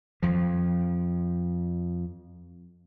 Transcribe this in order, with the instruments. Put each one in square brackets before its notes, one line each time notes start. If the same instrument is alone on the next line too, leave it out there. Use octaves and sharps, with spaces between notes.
[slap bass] F2 F3